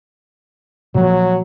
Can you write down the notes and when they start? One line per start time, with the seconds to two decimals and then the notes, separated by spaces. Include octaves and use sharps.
0.95 A#2 F3 F#3 G#3